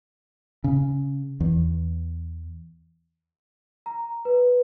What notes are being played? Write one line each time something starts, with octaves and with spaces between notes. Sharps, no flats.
C#3
E2
A#5
B4